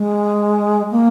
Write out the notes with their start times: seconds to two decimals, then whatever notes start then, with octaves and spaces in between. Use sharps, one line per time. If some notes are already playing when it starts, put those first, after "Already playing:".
Already playing: G#3
0.91 A#3